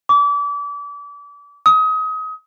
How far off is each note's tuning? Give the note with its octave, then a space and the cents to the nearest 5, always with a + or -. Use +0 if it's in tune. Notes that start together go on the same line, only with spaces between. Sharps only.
D6 -35
D#6 +30